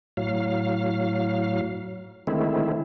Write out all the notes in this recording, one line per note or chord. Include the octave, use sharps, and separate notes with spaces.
A2 F#3 F5
D3 D#3 G#3 A3 C4 E4